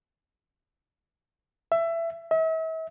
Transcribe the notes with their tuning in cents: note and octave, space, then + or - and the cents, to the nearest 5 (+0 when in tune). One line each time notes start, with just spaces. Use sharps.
E5 +20
E5 -40